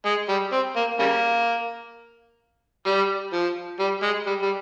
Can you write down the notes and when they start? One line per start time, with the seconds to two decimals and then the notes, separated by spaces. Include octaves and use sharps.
0.06 G#3
0.29 G3
0.52 C4
0.76 A#3
0.99 C#3 G3 A#3
2.86 G3
3.32 F3
3.79 G3
4.02 G#3
4.26 G3
4.42 G3